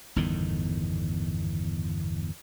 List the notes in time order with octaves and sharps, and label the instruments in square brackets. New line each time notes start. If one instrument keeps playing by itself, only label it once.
[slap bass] G1 E2 A2 D#3